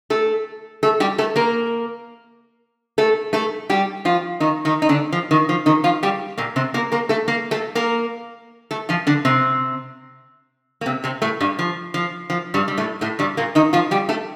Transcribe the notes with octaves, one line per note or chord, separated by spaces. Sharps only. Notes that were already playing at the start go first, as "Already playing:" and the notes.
A3 A4
A3 A4
G3 G4
A3 A4
A#3 A#4
A3 A4
A3 A4
G3 G4
F3 F4
D#3 D#4
D#3 D#4
D#4
D3 D4
F3
D#3
F3
D#3 D#4
F3 F4
G3 G4
A#2 A#3
C3 C4
A#3 A#4
A#3 A#4
A3 A4
A#3 A#4
A3 A4
A#3 A#4
A3 A4
F3 F4
D3 D4
C3 C4
A#3
C3 C4
C3 C4
A2 A3
G2 G3
F3
F3
F3
G2 G3
G3
A2 A3
A2 A3
G2 G3
A#2 A#3
D#3 D#4
F3 F4
G3 G4
A3 A4